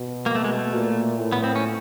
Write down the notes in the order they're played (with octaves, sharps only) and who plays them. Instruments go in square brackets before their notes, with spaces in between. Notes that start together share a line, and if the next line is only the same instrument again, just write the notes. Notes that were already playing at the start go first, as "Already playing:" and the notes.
Already playing: [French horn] B2
[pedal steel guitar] A#3
A3
G#3
A3
[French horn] A#2
A2
[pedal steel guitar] B3
C4
C#4